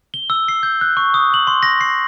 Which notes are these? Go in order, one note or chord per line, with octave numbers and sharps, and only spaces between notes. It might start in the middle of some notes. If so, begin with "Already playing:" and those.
G7
E6
C7
G6
F#6
C#6
D#6
F#7
C6
A#6
C7